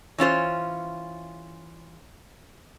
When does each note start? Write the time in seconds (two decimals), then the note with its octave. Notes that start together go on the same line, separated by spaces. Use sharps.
0.18 E3 C#4 F4 C5